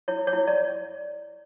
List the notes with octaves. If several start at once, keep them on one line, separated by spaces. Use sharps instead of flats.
E4 C#5
C#5
E4
D5